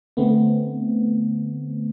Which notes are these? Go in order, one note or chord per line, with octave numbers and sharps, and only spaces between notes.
D3 A3 B3 C4